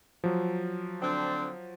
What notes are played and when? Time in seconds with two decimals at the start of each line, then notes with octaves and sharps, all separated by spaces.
0.24 F3 F#3
1.02 D3 C4 D4